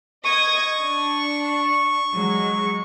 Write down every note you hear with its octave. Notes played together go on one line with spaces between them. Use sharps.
D#5 C#6 D#6 G#6
D4
F#3 G#3